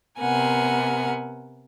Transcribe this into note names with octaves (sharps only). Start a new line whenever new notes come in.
C3 B3 A#4 F#5 G#5